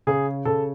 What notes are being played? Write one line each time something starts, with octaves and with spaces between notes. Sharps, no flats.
C#3 G#4
C#3 A4